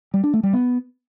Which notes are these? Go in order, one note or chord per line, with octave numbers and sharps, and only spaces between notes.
G3
D4
A3
G3
B3